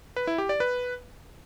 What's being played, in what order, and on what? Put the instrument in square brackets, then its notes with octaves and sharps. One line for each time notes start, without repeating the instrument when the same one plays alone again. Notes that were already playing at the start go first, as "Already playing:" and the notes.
[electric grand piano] B4
E4
G4
D5
B4